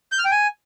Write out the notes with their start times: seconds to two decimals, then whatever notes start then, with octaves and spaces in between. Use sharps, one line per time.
0.12 G6
0.18 F6
0.25 G5
0.31 G#5